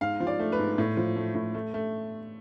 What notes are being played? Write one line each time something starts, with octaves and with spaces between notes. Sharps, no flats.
G#2 F5
F3
D5
A3
B4
G#2
A2
F3
A3
A2
A3
A3